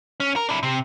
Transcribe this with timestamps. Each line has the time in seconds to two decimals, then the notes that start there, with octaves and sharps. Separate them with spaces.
0.20 C#4
0.36 A#4
0.49 D4 E4
0.63 C3